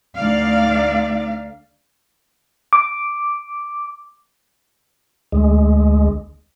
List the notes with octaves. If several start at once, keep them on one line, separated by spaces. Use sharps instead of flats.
D2 D#4 D5 F5
D6
D2 G#3